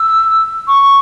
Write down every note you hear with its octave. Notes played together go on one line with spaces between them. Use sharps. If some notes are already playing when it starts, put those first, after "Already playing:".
Already playing: E6
C#6